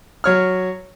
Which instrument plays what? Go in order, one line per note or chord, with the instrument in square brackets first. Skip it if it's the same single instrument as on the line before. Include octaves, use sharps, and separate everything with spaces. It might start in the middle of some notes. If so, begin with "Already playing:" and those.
[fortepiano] F#3 C#5 F6